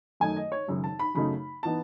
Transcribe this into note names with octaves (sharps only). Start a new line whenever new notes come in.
F#2 D#3 A3 D#4 G#5
D#5
C#5
G#1 F#2 C#3
A5
B5
F#2 C#3 F#3 A3 D#4 B5
E3 B3 D#4 A5